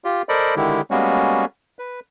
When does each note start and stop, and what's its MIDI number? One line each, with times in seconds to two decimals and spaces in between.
0.04 0.22 65
0.04 0.22 67
0.29 0.55 69
0.29 0.55 70
0.29 0.55 72
0.29 0.55 74
0.29 0.55 75
0.29 0.55 83
0.56 0.81 50
0.56 0.81 51
0.56 0.81 56
0.56 0.81 64
0.56 0.81 67
0.91 1.45 55
0.91 1.45 56
0.91 1.45 58
0.91 1.45 59
0.91 1.45 61
0.91 1.45 66
1.79 2.00 71